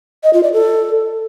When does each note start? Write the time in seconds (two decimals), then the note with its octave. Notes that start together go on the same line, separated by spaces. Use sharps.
0.23 D#5
0.33 F4
0.43 D5
0.53 A4